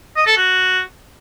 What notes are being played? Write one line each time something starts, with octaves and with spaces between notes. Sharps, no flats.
D#5
A4
F#4